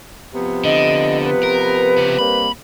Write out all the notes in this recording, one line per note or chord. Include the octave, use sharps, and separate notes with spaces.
C3 F3 B3
D3 D#5
B4
A#4
C#3 C5
G3 A#3 C4 B5